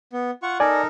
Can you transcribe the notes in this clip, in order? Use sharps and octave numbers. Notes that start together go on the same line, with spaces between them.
B3
F4 F#5 C#6
D#4 A4 A#4 D5 G#5